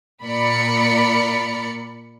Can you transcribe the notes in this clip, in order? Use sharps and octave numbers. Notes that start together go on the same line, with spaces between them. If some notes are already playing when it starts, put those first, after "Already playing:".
A#2 A#4 D5 B5 C#7